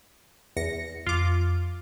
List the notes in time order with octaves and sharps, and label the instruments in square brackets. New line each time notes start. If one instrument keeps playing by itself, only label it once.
[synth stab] E2 A#6 C#7
[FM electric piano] F2 [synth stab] F4 D6